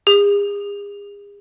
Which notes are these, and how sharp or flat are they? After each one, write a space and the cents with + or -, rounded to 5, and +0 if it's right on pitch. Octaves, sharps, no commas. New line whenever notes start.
G#4 -40